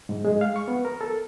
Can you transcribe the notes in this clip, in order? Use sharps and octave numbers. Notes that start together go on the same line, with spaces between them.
G#2
G#3
F5
C#6
B3
A#4
A4